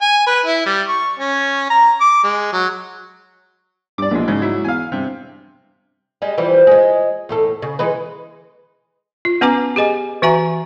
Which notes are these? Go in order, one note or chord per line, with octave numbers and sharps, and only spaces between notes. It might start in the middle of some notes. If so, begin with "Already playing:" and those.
G#5
B4
E4
G3
C#6
C#4
A#5
D6
G#3
F#3
G2 D5 D6
A#1 B2 E3 G#3
G#2 C#3
F#3 E4
E2 F5 G#5
G2 C3
G3 G#3
E3 F3 G3
G#3 G#4
E2 A2 A4
C#3
E3 G#3 B4
F4
B3 C#4 B4 G#5 A#5 D6
G4 G#4 D#5 G#5
E3 F#4 E5 G#5 A#5